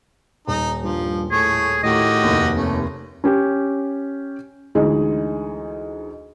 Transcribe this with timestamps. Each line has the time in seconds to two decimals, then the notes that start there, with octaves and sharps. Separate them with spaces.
0.48 D#1 D#4
0.83 G2 F3
1.31 A2 A3 G#4 C#5
1.83 A2 D#3 F#4 G4 D#5
2.23 F1 D#2
2.56 C3 A3 C#4
3.24 C#4 G4
4.75 D2 E3 G#3 D#4 G#4